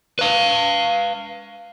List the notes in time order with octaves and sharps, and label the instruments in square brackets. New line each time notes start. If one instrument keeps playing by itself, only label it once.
[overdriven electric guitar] B4 F5